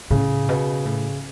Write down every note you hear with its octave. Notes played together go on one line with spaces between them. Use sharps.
A2 C#3
B2
A2